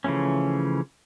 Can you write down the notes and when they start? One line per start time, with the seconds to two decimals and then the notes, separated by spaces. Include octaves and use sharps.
0.04 C#3 E3 F3 A3 C#4